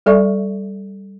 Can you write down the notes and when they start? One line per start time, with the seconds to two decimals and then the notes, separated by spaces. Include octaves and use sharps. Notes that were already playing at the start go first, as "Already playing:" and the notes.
0.06 G3 A4 D5 E5 C#6